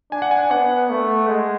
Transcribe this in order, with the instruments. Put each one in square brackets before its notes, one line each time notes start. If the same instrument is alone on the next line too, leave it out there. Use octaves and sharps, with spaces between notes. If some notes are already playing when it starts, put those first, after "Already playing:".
[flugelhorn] D4 [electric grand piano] G#5
[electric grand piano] F#5
G#5
[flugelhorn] B3 [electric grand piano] F#5
[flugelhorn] A3
G#3